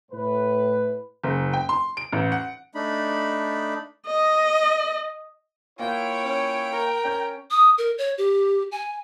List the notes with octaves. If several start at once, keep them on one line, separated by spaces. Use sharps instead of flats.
A2 B4
F#1
G5
C6
D7
A1
F#5
A3 D4 D#4 B5
D#5
A#3 E4 F4 C#5 G5
C#4
A#4
C#4 G6
D#6
A#4
C#5
G4
G#5